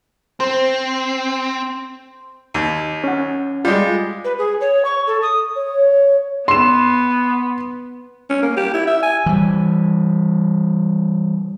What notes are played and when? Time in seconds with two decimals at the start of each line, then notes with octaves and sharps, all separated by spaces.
0.40 C4 C5
2.54 D#2
3.04 C#4 F#5
3.65 G3 G#3 F4
4.24 B4
4.38 G#4
4.61 C#5
4.85 C#6
5.07 A4
5.22 D#6
5.56 C#5
6.48 B3 C6 E7
8.30 C#4
8.42 A#3
8.57 G4
8.74 E4
8.87 E5
9.03 G#5
9.26 E3 G3